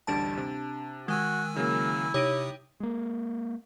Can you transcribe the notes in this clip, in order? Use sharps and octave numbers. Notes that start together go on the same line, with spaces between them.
A1 D2 G3 D4 A5
C3
D#3 G#3 F#4 G#5 E6
C#3 F#3 A#3 E4
C3 D#4 G4 C#5 D#6 D7
G#3 A#3